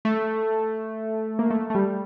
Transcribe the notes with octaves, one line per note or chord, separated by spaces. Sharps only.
A3
A#3
A3
A3
G3